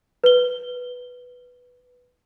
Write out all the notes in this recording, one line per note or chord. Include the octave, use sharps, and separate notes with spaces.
B4 G7